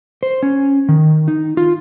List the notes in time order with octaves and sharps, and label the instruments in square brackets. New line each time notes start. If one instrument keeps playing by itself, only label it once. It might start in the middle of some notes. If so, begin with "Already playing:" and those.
[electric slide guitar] C5
C#4
D#3
D#4
F4